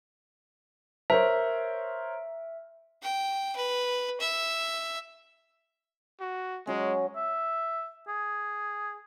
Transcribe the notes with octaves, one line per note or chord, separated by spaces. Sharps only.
A#4 C5 C#5 E5
G5
B4
E5
F#4
F#3 G#3 C#4
E5
G#4